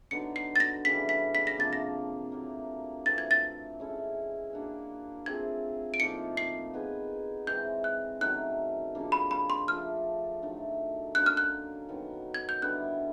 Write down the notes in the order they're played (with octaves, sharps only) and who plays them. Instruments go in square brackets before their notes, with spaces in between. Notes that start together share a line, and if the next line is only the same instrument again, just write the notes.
[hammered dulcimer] D3 F#3 B3 D#4 [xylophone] C#7
[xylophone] C7
A6
A#6
[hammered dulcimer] C#3 E3 G3 [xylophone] B6
[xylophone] B6
B6
A#6
[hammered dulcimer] C3 F3 A#3 D4 [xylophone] A6
[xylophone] A#6
[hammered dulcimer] A2 F#3 A#3
[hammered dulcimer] E3 A3 C4 F4 [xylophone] A6
[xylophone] G#6
A6
[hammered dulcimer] G#3 C#4 E4 A4
A#3 D4 F#4
[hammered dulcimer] A3 C4 F4 G#4 [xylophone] G#6
[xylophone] D7
[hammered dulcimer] A2 F3 A#3 D#4 [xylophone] C#7
[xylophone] C7
[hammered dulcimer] B3 D#4 G#4 B4
[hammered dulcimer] E3 G#3 C4 [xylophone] G6
[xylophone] F#6
[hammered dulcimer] D#3 F#3 A3 C#4 [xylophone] F#6
[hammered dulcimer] C#3 F3 A#3 D4
[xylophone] B5
B5
C6
[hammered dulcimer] F3 A3 D4 [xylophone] F6
[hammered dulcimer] D#3 F#3 A3 D4
[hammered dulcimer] D3 F#3 A#3 C#4 [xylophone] F#6
[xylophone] F6
F#6
[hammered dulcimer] D#3 F#3 B3
[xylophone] G#6
G6
[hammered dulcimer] D3 G3 B3 E4 [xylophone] F#6